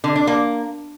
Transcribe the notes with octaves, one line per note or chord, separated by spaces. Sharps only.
D3
D4
A#3